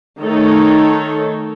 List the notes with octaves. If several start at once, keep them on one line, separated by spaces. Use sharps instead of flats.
D#3 A3 D#4 A4 C#5